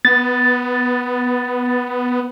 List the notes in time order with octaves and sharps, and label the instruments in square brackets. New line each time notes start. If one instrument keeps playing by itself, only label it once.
[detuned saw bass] B3 [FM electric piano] A6